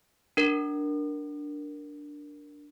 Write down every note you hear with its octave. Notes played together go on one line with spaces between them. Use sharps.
D4 A#4